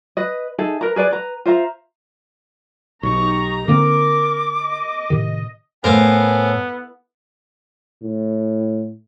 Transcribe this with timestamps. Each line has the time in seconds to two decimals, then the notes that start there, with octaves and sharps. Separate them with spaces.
0.17 B4 D#5
0.58 D#4 G#4 A4 E5
0.81 A#4 B4 A#5
0.96 G#4 B4 D5 G#5
1.11 B4 A#5
1.46 F4 C5 E5 A#5
3.03 B1 D#4 G4 A#5 C#6
3.68 D3 A#3 C4 A#4 D6
4.62 D#5
5.10 A2 C3 D#3
5.84 A2 B3 A#4 C5 F5 G#5
8.02 A2